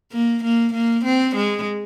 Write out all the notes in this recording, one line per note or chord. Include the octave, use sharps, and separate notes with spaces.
A#3
A#3
A#3
C4
G#3